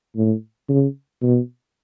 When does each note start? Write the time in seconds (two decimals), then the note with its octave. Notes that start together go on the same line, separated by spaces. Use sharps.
0.17 A2
0.69 C#3
1.22 B2